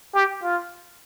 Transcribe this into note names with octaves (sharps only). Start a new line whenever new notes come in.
G4
F4